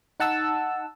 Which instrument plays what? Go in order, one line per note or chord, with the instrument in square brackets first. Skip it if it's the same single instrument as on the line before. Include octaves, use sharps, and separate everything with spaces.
[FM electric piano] D#4 F#5 A5 E6